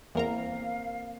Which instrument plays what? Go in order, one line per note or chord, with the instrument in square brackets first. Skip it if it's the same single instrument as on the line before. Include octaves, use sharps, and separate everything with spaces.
[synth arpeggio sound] E2 A#4 A#5 [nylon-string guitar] A#3 C4 [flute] F5